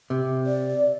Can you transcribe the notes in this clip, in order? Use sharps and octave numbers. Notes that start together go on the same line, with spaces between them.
C3
D5